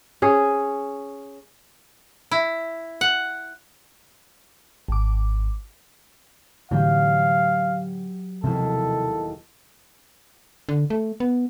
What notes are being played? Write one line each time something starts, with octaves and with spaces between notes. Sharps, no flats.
C#4 G#4
E4
F#5
G#1 D6
A2 D3 E3 F#3 G4 F5
E1 D#2 C3 F3 E4 A4
D3
A3
B3